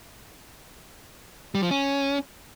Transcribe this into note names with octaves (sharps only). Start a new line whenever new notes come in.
G3
F3
C#4